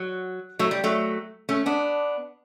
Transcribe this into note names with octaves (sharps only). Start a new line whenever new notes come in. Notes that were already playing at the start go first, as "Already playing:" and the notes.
Already playing: F#3
F#3 A3
G3
F#3 A3
A3 C#4
B3 D4